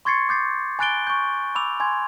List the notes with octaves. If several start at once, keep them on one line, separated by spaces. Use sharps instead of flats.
C6 C#6 G#6 A6 C7 C#7
D6 G6 A6 C7
G#5 B5 F#6 A6 D7 G7
C#6 G6
B5 D6 E6 F7
G#5 C6 G#6